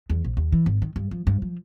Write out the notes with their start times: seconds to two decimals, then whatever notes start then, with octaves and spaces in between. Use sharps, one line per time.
0.10 E2
0.24 A#1
0.37 D#2
0.52 E3
0.66 G#1
0.82 D#3
0.96 G2
1.11 F3
1.27 G2
1.42 F3